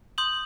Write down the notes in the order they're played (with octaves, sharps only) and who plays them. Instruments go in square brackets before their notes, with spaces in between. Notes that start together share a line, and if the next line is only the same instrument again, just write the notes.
[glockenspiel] C6 D#6 G6 F#7